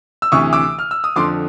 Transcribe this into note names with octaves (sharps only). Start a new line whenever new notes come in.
E6
D2 C3 E3 C#6 D#6
D6 E6
F6
E6
D#6
F2 D3 F3 C6 D6